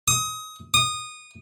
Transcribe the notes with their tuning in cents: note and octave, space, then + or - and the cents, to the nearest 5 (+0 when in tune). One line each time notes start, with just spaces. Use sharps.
D#6 +20
D#6 -20